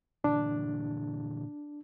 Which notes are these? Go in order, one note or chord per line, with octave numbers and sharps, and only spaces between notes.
A#2 D3 E3 D4